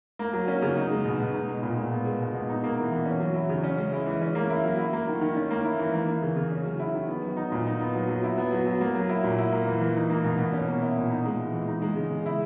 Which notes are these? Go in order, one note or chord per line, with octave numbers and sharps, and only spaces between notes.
A#3
F#3
C#4
C#3
D#4
G#3
B2
B2
D#4
G#3
A#2
A#2
B3
G#3
B2
B2
D#4
A#3
E3
E3
C#4
F#3
E4
C#3
C#4
G#3
E4
E3
C#4
A#3
E4
F#3
E4
A#3
D#3
D#3
C#4
A#3
E4
E3
A#3
E3
C#3
C#3
C#4
F#3
E4
D#3
B3
F#3
D#4
A#2
D#4
B3
F#3
F#3
E4
B3
F#3
F#3
A#3
F#3
E4
A#2
E4
A#3
E3
E3
D#4
A#3
B2
B2
C#4
A#3
E4
A#2
D#4
G#3
E3
E3
D#4
G#3
C#3
C#3
E4